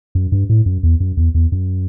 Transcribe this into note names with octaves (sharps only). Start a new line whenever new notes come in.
F#2
G2
A2
F#2
E2
F#2
E2
E2
F#2